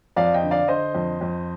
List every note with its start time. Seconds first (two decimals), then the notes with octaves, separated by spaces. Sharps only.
0.16 F2 D5 F5
0.34 D#5 G5
0.43 D3
0.51 D5 F5
0.68 D3 C5 D#5
0.94 F2
1.21 F2